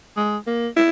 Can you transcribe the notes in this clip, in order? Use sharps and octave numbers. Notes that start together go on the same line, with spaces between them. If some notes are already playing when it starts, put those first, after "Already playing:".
G#3
A#3
E4